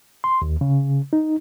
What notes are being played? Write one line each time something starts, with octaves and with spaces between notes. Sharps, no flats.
C6
D#2
C#3
D#4